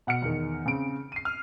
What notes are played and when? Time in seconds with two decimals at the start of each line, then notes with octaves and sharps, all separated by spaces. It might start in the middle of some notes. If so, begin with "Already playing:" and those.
0.07 B2 F#5 F6 C#7
0.22 E2 D#3
0.66 C#3 C4 D7
1.12 C7 D#7
1.25 F6